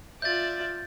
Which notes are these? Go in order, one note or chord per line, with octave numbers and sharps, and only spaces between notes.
F4 D5 E5 G6 A6